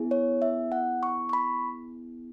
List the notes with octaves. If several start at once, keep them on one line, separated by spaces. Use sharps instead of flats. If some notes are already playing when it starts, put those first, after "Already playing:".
Already playing: B3 E4 G#4
C#5
E5
F#5
C#6
C#6
B5